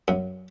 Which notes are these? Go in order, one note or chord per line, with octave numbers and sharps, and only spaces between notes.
F#2